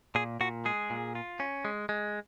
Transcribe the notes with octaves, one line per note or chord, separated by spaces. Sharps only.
A#2 G#4
A#2 F#4
G#3 G#4
A#2
F4
C#4
G#3
G#3